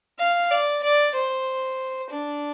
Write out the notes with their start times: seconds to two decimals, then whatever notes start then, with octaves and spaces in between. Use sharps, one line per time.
0.19 F5
0.51 D5
0.83 D5
1.15 C5
2.10 D4